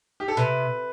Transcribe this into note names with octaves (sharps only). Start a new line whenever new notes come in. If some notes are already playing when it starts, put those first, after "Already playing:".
G4
A4
C3 B4